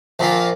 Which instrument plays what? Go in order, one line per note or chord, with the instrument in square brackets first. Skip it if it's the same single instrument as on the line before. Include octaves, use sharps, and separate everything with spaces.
[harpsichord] A#1 A#2 F3 [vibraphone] C5
[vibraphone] A#4